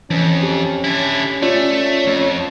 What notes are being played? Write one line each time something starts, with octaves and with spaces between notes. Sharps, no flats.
F2 E3 C#4
G4
D3 E4
A3 C#4 F4 C#5 D5
F2